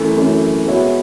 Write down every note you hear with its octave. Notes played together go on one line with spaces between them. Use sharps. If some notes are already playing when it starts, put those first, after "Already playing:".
Already playing: F#2 E3 A3
F#2 E3 A3
G#3 B3 F#4 C#5 E5